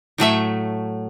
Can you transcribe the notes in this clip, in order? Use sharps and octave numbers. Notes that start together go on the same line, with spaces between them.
A2 F#3 A3 E5